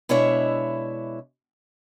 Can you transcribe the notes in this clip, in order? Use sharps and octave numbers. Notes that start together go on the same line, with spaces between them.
B2 G#3 D4 E4 C#5 E5